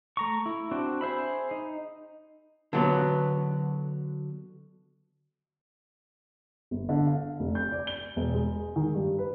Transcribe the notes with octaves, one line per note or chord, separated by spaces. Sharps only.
A3 A#5 C#6
E4
C4 D4 F#4
G#4 C5 E5 B5
D#4
D3 F#3 B3
G1
D3
F5
F1
G6
D5
G7
E1
G#3
D#3
G2
B4